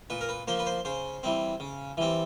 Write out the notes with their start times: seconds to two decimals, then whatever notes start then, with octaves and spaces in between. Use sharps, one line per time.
0.10 A#2 B4
0.21 A#4
0.29 B4
0.47 F3 A#3 C5
0.59 B4
0.66 C5
0.85 C#3 C5
1.23 E3 G3 C4
1.60 C#3
1.97 E3 G3 C4